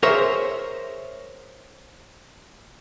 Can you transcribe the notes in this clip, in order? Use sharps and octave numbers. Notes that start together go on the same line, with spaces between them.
G#4 A#4 C5 C#5 E5